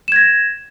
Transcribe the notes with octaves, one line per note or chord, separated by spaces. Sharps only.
G#6 A#6 E7